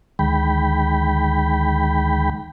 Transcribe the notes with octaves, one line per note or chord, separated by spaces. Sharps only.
D2 D#3 G#3 G5 B5